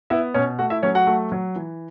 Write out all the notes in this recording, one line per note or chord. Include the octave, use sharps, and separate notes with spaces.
B3 E4 E5
B2 C#4 C#5
A3 F#4 F#5
E4 E5
F#3 C#4 C#5
F#4 F#5
A3
F#3
E3